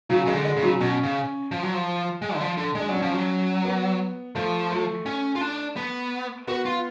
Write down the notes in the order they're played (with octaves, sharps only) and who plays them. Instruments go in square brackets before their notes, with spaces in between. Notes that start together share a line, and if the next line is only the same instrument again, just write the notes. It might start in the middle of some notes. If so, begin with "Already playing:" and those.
[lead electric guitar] C#3 [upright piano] F#3
[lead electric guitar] C#3 [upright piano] G#3
[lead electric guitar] D3
[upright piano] G#3
[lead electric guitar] C#3
[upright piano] F#3
[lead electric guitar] B2 [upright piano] C#4
[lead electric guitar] C#3
F3
F#3
F3
G#3
D3
F3
D3
[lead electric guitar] G#3 [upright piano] D4
[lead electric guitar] F#3 [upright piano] C#4
[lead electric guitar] F3
F#3
[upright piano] B3
[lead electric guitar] F3 [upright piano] A3
[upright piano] A3
[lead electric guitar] C#4
F4
D4
B3
[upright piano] B3 [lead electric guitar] F#4
[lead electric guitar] F4